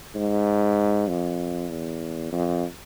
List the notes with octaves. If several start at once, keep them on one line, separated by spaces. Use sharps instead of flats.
G#2
F2
E2
F2